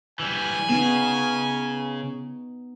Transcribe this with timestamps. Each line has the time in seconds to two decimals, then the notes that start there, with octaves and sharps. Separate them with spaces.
0.20 E3 G3 G#5
0.70 C#3 B3 D#4